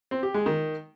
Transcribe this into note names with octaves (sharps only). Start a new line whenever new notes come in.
C4
G4
G#3
D#3